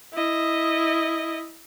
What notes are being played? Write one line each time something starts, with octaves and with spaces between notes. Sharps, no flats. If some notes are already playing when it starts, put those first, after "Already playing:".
E4 D#5